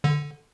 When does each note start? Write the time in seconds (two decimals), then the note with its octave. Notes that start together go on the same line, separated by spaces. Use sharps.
0.04 D3